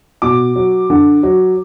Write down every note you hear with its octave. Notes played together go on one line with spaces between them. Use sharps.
B2 D6
F#3
D3
F#3